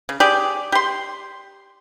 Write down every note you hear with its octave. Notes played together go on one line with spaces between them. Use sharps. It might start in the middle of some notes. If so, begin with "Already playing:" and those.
C#3
G4 G#4 D5
G4 C6